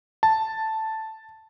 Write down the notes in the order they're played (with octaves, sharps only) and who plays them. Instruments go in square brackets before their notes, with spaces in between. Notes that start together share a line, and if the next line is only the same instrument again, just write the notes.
[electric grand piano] A5